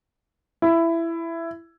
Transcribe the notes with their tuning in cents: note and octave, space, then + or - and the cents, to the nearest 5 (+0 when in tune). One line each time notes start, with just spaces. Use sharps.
E4 +15